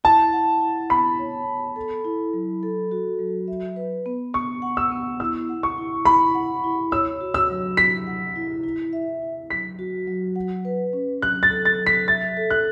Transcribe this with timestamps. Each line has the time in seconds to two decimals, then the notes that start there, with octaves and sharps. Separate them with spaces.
0.04 E4 A5
0.33 F#5
0.61 E4
0.90 B3 B5
1.19 C#5
1.48 B3
1.76 A4
2.05 E4
2.33 F#3
2.63 A4
2.91 F#4
3.19 F#3
3.48 E5
3.76 B4
4.06 B3
4.34 B3 C#6
4.62 F#5
4.77 E6
4.92 B3
5.20 E4 E6
5.49 F#5
5.63 C#6
5.78 E4
6.05 E4 B5
6.35 F#5
6.64 E4
6.92 C#5 E6
7.21 F#4
7.34 E6
7.50 F#3
7.77 E4 B6
8.07 F#5
8.36 E4
8.64 E4
8.93 E5
9.22 E4
9.50 F#3 B6
9.79 F#4
10.08 F#3
10.36 F#5
10.65 B4
10.93 C#4
11.22 F#3 F#6
11.43 A6
11.50 A4
11.65 A6
11.79 F#3
11.86 B6
12.08 E5 A6
12.37 A4
12.50 F#6